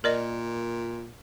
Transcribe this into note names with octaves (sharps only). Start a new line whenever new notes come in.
A#2 A#4 D5 D#5